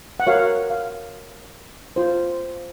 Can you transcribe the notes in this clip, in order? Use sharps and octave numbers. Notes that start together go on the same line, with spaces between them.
F#5
F#4 A#4 C#5 F5
F5
F4 C5